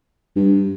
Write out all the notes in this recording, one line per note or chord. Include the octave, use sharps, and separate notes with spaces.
G2